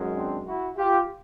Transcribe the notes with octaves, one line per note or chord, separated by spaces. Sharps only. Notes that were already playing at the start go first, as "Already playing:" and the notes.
Already playing: F#2 D#3 G#3
C4 D4
E4 F#4
F4 G4